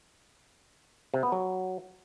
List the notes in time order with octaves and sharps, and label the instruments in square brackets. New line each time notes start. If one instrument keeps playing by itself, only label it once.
[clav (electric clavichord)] C3
B3
F#3